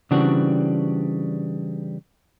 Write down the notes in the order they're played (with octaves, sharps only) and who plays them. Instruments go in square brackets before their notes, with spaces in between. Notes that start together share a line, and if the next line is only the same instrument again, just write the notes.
[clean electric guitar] C#3 E3 G3 C4 D4 F#4